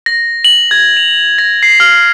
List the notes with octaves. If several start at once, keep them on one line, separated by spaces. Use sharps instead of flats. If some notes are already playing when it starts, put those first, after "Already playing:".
A#6
F#7
G#6
F7
A#6
C7
F6